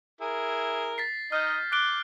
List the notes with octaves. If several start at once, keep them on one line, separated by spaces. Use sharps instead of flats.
E4 G#4 A#4
A6 B6 C7
D#4 D#5 F6 G6
D6 F#6 D7 G7